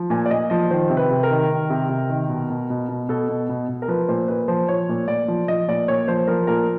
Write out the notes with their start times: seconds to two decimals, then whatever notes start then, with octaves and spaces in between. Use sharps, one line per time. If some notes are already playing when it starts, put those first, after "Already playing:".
Already playing: F3
0.10 A#2 G#5
0.26 D5
0.31 A#2 D#5
0.50 F3 D#5
0.71 D#3 C5
0.90 C3
0.97 B4
1.10 C3
1.23 A#4
1.31 D#3
1.51 D#3
1.70 C3
1.89 C3
2.09 D#3
2.29 B2
2.50 B2
2.70 B2
2.89 B2
3.09 B2 A4
3.29 B2
3.49 B2
3.69 B2
3.82 A#4
3.88 F3 B4
4.08 A#2 C5
4.28 A#2 B4
4.48 F3 C5
4.68 F3 C#5
4.89 A#2
5.08 A#2 D5
5.28 F3
5.48 F3 D#5
5.68 A#2 D5
5.88 A#2 C#5
6.08 F3 C5
6.27 F3 A#4
6.47 A#2 A#4